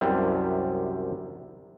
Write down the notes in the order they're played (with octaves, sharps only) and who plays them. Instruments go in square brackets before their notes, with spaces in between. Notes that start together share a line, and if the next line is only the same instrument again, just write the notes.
[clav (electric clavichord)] C2 F#2 C3 G3